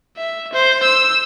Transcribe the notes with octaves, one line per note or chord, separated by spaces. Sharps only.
E5
C5
E6